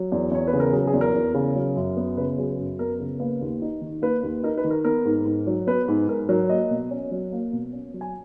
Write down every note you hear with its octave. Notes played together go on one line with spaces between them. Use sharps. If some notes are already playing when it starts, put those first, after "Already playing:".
Already playing: F#3
E2
E2 C#5
B4
C#3
A#4
F#3 G#4
G#4
E2
A#4
E2
C#3
F#3
F#2
B3
C#3 B4
F#3 G#4
F#2
B3 A#4
C#3
A#3 B4
D#2
D#4
D#3
A#3 B4
D#2
D#4 A#4
B4
D#3
A#4
B3 A#4
G#2
G#2
F#3
B3 B4
G#2
G#2 A#4
F#3 A#4
A#3 D#5
B2
C#4
F#3
A#3
B2
C#4
F#3
G#5